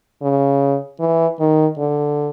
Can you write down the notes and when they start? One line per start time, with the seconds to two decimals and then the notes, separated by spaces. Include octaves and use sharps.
0.22 C#3
1.00 E3
1.39 D#3
1.78 D3